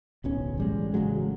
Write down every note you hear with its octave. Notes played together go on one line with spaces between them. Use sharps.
D1 B1 C#4
A1 G3 G#3
A1 C#3 F#3 G#3